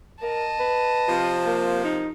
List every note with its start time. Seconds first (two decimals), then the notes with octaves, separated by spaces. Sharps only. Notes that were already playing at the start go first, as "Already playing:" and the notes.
0.22 A#4 D#5 A5
0.60 B4
1.08 C3 F3
1.46 A#3
1.84 D#4